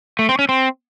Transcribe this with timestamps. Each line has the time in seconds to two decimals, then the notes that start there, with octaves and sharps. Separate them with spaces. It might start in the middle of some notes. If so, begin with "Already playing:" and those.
0.19 A3
0.29 C4
0.39 C#4
0.49 C4